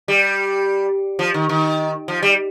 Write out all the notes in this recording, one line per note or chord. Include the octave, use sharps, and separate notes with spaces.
G3
F3
D#3
D#3
F3
G3